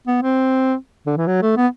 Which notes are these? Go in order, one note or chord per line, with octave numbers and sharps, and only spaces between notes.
B3
C4
D3
E3
F#3
A3
B3